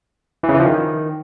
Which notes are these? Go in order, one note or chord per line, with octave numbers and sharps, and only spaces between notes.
E3
C#3
E3
F3
D#3